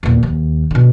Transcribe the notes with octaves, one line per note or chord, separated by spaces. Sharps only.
E2 A#2
D#2
B2 D3